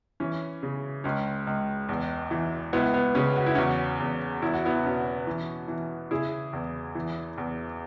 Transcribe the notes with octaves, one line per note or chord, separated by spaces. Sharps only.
E3 C#4
C#3
C#2 C#4
C#2
E2
E3
C#2 B3 E4
B3
C#3 C#4
F#4
E4
E2 C#4 F#4
E2
E2 E4
F#4
B3 E4
B2 C#4 F#4
E3
E3
C#3 E4 G#4
E2
E3
E2